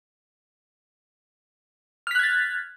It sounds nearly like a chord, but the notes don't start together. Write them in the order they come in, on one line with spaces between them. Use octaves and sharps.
F6 B6 F#6 G#6 A6